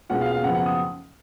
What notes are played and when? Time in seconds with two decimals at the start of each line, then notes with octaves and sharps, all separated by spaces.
0.09 B2 G#3 C#4 F4 F#5
0.21 F5
0.32 F5
0.43 F#2 C#3 F3 B3 F4 F#5
0.55 F#5
0.66 D#6